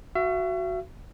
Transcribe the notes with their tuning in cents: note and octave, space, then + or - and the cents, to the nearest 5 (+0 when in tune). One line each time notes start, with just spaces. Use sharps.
F#4 +0 E5 +40